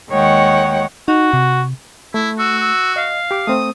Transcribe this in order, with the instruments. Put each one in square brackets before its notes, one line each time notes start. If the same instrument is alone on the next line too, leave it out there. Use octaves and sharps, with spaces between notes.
[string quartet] D#2 D#3 G#3 C#5 F#5 G5
[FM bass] D#4 [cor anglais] F#4
[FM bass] C3
[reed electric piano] A3 [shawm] E4
[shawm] F#4 [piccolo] E6
[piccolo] E6
[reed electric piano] D#5 [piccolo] F5
[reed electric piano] G4 D6
[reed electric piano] A3 C4 C5 [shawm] D#6